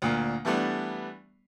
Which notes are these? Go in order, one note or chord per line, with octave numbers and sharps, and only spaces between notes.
D2 A#2 A#3
E3 G3 A3 B3 D4